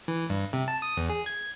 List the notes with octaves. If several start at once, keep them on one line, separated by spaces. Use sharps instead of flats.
E3
G2
C3
A5
D#6
E2
G#4
G#6